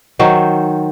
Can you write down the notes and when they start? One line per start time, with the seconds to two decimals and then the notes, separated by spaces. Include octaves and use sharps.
0.19 D#3 F#3 C5